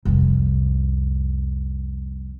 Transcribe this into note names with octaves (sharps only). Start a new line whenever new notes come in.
C2 F2